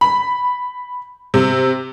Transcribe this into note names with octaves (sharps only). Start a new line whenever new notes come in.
B5
C3